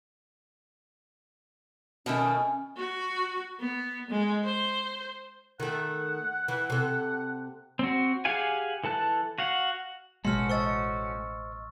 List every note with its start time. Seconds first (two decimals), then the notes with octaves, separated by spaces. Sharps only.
2.06 B2 D#3 A3 C#4
2.77 F#4
3.60 B3
4.10 G#3
4.44 C5
5.60 D#3 A3 F#5
6.48 E3
6.70 C3 A4
7.79 C4 F#4
8.25 G4 G#4 F5 F#5 G#5
8.84 E3 A4 A5 F#6
9.38 F#4 F5 F#5
10.25 A1 B2 G#3 A3 C#4 F#4 C6 F6
10.49 C5 D#5 C#6 E6 A6